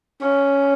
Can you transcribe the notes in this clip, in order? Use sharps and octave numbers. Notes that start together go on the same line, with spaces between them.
C#4